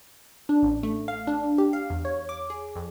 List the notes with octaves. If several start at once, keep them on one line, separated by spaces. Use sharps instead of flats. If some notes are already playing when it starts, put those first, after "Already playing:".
D4
A1
A3
F5
D4
G4
F5
E2
C#5
D6
G#4
F2